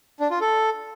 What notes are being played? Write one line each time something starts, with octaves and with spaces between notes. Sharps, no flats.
D4
F4
A4